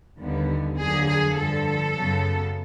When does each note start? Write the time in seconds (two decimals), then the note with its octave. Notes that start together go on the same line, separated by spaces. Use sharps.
0.19 D#2 D3 G3 B3
0.77 F2 D3 F#3 A#3 G#4
1.06 G#4
1.36 G2 D3 F3 A4
1.95 F#2 C#3 F#3 B3